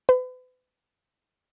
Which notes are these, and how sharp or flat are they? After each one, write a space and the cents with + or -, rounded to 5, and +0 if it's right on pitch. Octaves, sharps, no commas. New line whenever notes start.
B4 +40